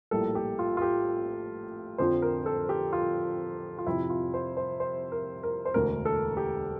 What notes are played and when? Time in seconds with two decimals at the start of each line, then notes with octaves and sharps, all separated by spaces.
0.11 A#1 A2 G3 A#3 A4
0.35 G4
0.59 F4
0.77 F4
0.82 G4
1.98 F2 D3 F3 C4 C5
2.22 A#4
2.46 A4
2.69 G4
2.93 F4
3.78 F4
3.86 F2 C3 F3 C4 E4
4.10 F4
4.34 C5
4.57 C5
4.80 C5
5.12 A#4
5.43 A#4
5.65 C5
5.74 E1 D2 D3 A#4
6.05 A4
6.37 G4